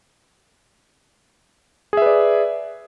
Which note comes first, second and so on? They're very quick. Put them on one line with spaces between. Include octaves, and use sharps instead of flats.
G#4 E5 B4 D5